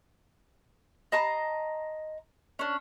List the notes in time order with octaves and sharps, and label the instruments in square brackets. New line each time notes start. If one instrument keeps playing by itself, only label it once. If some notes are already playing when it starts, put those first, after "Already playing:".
[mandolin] D#5 A5 A#5 C6
C#4 D4